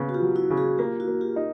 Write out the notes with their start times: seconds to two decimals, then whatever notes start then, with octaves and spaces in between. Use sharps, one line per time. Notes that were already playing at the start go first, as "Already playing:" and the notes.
Already playing: C#3 B3
0.09 F#4
0.14 F4 G4
0.22 F#3
0.36 E4 F#4
0.50 C#3
0.57 F#4 G#4
0.78 A#3 F4 G4
1.00 E4 F#4
1.08 A#3
1.21 F4 G4
1.36 D#4